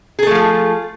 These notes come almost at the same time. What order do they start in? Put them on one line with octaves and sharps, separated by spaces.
G#4 A4 A3 F3 F4